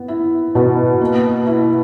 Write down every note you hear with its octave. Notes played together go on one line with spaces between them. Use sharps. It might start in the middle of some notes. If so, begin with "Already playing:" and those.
Already playing: B3
E4
B2
A#3
E4